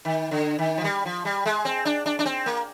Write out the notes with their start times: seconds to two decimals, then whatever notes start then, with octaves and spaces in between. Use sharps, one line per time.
0.05 D#3
0.31 D3
0.59 D#3
0.78 F3
0.84 G3
1.05 F3
1.25 G3
1.46 G#3
1.65 C4
1.85 D4
2.06 D4
2.19 D4
2.26 C4
2.46 A#3